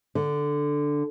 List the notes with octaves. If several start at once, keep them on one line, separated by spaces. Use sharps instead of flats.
D3